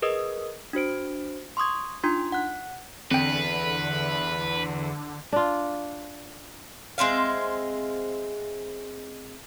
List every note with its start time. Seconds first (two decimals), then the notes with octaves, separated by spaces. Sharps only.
0.02 G#4 A#4 B4 D#5 D#6
0.73 D4 F#4 C5 D7
1.57 C6 C#6 D#6 G#6
2.04 D4 D#4 F4 C6 G#6
2.32 F#5 F#6
3.11 E2 D3 C4 B4 G5
5.32 D4 F4
6.98 G#3 C4 E5 F5